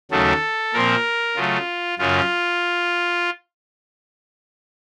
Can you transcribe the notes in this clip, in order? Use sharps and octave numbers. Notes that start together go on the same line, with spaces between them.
D#2 C#3 F#3 A3 A4
A#2 F3 C4 A#4
C#3 F#3 A3 F4
F#2 C#3 F#3 F4